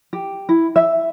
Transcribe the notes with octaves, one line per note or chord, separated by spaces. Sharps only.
G4
E4
E5